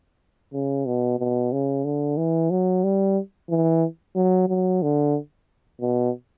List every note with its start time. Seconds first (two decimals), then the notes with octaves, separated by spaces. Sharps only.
0.53 C#3
0.86 B2
1.19 B2
1.52 C#3
1.85 D3
2.17 E3
2.51 F#3
2.84 G3
3.50 E3
4.15 F#3
4.48 F#3
4.83 D3
5.81 B2